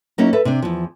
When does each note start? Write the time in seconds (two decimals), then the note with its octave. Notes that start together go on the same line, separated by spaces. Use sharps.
0.18 F#3 A#3 C#4 D#4 E4 F#4
0.33 A4 B4 E5
0.45 C3 D4
0.62 E2 F3